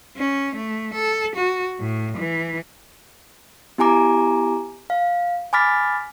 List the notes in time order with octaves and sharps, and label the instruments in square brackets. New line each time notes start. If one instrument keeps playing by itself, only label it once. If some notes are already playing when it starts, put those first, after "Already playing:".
[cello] C#4
A3
A4
F#4
A2
E3
[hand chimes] B3 E4 G4 G#5 A#5 D6
F5
G#5 B5 D6 F6 A6 B6